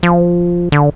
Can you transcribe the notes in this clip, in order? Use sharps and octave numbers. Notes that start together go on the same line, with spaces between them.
F3
D3